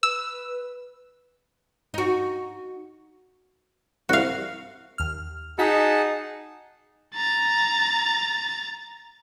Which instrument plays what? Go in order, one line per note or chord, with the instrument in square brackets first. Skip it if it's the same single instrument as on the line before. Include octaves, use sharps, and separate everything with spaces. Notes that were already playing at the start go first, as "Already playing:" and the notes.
[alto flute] B4 [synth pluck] E6
[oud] D#4 F#4
[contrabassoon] C2 [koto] F#4 F5
[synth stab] D#2 F6
[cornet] D#4 [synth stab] F#4 B6 [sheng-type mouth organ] G#4 F#5 A5
[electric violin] A#5 A6